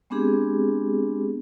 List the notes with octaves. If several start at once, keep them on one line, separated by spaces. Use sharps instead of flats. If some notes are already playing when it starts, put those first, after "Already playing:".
G#3 B3 C4 D4 G4 G#4